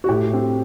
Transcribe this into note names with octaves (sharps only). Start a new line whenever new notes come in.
F#4
A2 G4
C4